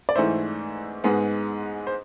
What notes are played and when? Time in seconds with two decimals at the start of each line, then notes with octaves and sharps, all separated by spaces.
0.09 D5
0.15 G#2 E3 A3 E4 C5
1.04 G#2 G#3 B3
1.87 C5